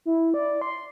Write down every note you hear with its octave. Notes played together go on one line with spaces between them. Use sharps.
E4
D5
C6